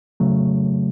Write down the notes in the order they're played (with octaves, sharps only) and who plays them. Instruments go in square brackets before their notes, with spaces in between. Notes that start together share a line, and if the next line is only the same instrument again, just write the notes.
[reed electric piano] C#3 F#3 A3